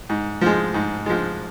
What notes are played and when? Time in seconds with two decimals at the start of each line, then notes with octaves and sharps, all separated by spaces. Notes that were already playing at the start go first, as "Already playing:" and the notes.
0.09 G#2
0.41 F3 G#3
0.74 G#2
1.06 F3 G#3